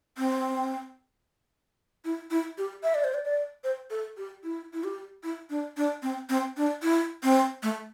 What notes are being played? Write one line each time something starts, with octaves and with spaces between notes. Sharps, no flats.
C4
E4
E4
G4
E5
D5
C5
D5
D5
C5
A4
G4
E4
E4
G4
E4
D4
D4
C4
C4
D4
E4
C4
A3